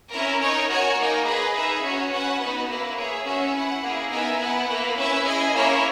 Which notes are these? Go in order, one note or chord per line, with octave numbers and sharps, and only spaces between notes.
C#4 E4 A#4
D#4 A#4 C#5
F#4 A#4 C#5 G#5
A#3 D#4 A#4
G#4 B4 D#5
D#4 G#4 B4 E5
C#4 F#4 C#5
C#4 F#4 B4 F#5
B3 D#4 F#4 B4
A#3 E4 B4
G#4 C#5 E5
C#4 F#4 C#5 E5
E4 B4 F#5
A#3 E4 G#4
B3 D#4 A#4 E5 G#5
B3 E4 B4 F#5
A#3 E4 B4
C#4 E4 B4 E5
E4 G#4 D#5 G#5
A#3 C#4 E4 A#4 C#5